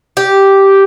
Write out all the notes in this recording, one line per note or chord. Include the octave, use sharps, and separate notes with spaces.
G4